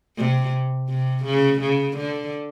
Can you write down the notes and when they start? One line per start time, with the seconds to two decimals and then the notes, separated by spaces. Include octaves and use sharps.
0.17 C3
0.89 C3
1.25 C#3
1.61 C#3
1.97 D3